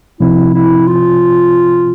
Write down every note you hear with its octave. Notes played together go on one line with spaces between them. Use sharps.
C2 C3 F3 C4 E4
E4
F4